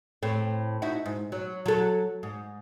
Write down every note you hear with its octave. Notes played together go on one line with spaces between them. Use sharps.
A2 C4
D#4 E4 F#4
G#2
F#3
F#3 A4
G#2